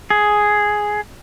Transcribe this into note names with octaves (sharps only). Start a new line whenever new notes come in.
G#4